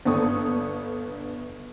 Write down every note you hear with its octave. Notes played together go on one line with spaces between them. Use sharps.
G1 B3 D4 A4 C#6 D#6